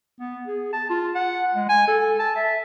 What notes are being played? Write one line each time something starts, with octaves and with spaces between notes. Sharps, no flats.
B3
G#4
A5
F4
F#5
G#3
G#5
A4
A5
E5